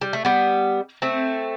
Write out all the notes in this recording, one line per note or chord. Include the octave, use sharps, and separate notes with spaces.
G3
A3
G3 B3
A3 C4